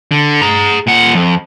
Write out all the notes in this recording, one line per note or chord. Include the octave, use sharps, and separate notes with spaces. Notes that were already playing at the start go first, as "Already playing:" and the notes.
D3
G#4 A#5
A#2 F#5
F2